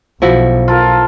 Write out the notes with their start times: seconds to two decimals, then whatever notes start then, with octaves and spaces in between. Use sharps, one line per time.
0.22 B1 F3 E4 F#4
0.68 F4 A4 A#4